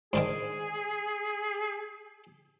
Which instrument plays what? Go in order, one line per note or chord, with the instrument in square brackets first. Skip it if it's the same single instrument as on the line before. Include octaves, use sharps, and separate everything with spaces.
[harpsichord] G#2 D3 D#3 [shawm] G#4